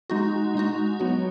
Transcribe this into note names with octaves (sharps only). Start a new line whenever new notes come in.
G#3 D#4 F#4
G#3 D#4 F#4
F#3 B3 F#4